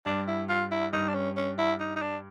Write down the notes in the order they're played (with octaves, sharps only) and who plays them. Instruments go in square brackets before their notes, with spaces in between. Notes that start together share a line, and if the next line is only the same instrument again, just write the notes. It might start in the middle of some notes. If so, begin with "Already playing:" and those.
[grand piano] G2 [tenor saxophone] D4
[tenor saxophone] E4
F4
E4
[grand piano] G2 [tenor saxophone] D#4
[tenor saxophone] D4
C#4
C#4
E4
D#4
D#4
D4